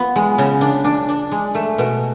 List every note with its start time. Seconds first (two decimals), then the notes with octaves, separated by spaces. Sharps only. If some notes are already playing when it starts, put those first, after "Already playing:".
Already playing: B3 F4
0.16 G#3
0.38 C#3
0.61 D4
0.84 D4
1.09 D4
1.32 G#3
1.55 A3
1.78 B2